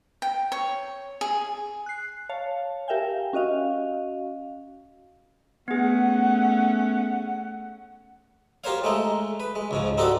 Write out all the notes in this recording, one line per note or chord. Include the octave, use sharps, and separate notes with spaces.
G5
C#5
G#4
F#6 C7
C#5 F5 A5
G4 A#4 E5 F5 G5 G#5
C#4 F#4 D#5 F5
A3 B3 C#4 G#4 F#5
F4 G4 A#4 C5 C#5 F5
G#3 A3 D#4
B4
G#3
C#2 G#2 F3
C4 D#4 F#4 G4 A4 D5